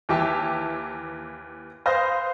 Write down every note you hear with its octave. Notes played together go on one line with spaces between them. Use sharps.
D#2 E3 G4 E5 A5
B4 C5 F5 D#6 A#6